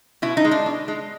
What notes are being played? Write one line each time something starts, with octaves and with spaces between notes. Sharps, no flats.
B2 E4
D#4
G#3
D4
B2
G#3